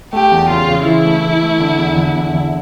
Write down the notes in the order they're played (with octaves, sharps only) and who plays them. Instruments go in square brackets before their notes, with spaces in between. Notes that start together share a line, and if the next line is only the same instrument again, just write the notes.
[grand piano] A3 [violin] G4
[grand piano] E2
[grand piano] C#3 [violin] F4
[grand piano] C#3
[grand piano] E3 [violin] E4
[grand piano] A3
E3
A3
D3
E2
D3
E2
D3